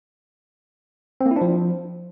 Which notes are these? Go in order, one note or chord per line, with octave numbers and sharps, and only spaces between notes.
C4
A#3
E4
D4
F3